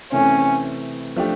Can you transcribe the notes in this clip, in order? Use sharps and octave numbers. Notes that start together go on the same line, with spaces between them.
C3 E3 A3 C4 C#4
F3 A3 D4 G4